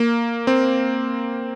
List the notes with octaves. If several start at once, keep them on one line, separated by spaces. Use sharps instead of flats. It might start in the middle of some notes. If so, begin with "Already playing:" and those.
Already playing: A#3
C4